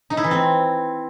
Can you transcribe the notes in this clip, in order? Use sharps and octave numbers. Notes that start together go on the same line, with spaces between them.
D#4
E4
E3
C4